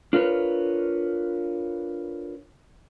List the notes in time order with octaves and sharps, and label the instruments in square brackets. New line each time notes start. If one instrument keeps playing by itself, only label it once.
[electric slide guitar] D4 F4 A#4 B4 C#5